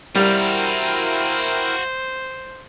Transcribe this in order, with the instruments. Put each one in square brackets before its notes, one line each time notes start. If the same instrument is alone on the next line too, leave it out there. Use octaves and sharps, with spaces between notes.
[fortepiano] G3 [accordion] E4 A#4 G5 [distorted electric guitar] F#4 F5 [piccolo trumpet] C5